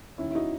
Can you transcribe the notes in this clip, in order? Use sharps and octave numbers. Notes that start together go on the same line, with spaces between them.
D#2 D#3 C#4 E4
E4
D#4 F#4